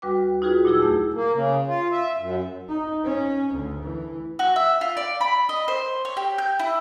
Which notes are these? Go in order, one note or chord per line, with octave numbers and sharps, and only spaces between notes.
D2 G3 F#4 B4 G5 D6
D#4 F4 F#4 G#4 B4
A#2 F#3 E4 G#4 E6
E2 A3
A#3
C#3
F4
E5
F#2
D#4
C#4
D2
E3
F#4
E5
F4
D5
B5
D#5
C5
C#5
G4
G6
E4